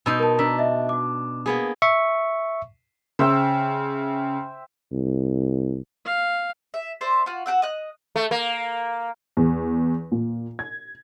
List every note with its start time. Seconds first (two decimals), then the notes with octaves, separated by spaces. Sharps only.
0.06 B2 D#4 C6 E6 G6
0.19 A#4 A5
0.39 D4 A#5 E6 B6
0.58 D#5 E5
0.89 F#4 D6
1.46 A#3 B3 G#4
1.82 E5 C#6
3.19 C#3 C5 E5 G5
4.92 C2
6.05 F5
6.74 E5
7.01 C5 D5 E5
7.26 F4 F#4
7.46 F#4 G4 F#5 E6
7.62 D#5 F#6
8.16 A3
8.31 A#3
9.37 E2
10.12 A#2
10.59 G#6